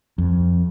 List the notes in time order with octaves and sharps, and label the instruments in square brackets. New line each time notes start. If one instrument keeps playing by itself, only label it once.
[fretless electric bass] F2